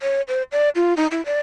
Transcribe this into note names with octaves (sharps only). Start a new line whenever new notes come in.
C#5
C5
D5
F4
D#4
E4
D5